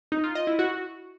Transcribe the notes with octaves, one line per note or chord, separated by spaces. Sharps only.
D#4
F4
D#5
E4
F#4